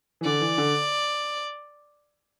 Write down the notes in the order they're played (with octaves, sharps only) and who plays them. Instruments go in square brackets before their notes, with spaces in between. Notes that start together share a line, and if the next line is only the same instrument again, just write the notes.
[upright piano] E3
[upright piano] D3 [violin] D5
[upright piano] E3
D3